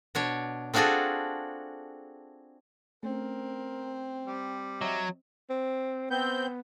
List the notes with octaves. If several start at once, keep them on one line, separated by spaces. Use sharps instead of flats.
B2 D4 C#5
C4 D4 F4 F#4 G#4 A4
A3 C4 C#4 A#4
G3
F#3 D#5 E5
C4
B3 C4 G6